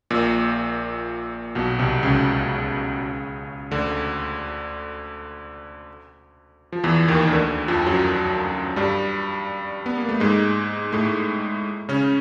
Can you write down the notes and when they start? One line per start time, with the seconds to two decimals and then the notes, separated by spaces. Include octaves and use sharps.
0.10 A#1 A#2
1.55 B1 B2
1.79 C2 C3
2.03 C#2 C#3
3.71 D2 D3
6.72 F3
6.84 E2 E3
7.08 D#2 D#3
7.28 D#3
7.32 D2 D3
7.68 F2 F3
7.86 F#2 F#3
8.76 G2 G3
9.86 B3
9.97 A#3
10.09 A3
10.20 G#2 G#3
10.92 A2 A3
11.89 C#3 C#4